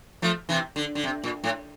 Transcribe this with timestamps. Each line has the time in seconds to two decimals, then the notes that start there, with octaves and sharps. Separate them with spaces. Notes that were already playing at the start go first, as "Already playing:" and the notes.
0.22 F3 A3
0.49 C3 E3
0.76 D3
0.95 D3
1.04 C3
1.24 A#2
1.44 A2